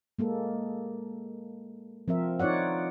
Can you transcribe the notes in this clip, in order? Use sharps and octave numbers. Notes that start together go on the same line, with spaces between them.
G#3 A#3 A4
F3 C4 A#4 E5
D#4 F4 C#5 D5 F#5